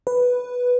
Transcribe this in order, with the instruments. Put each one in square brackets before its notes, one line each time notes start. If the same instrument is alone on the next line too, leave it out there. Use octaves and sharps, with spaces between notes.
[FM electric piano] B4